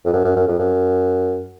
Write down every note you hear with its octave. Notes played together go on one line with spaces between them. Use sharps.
F2
F#2
F#2
F#2
F2
F#2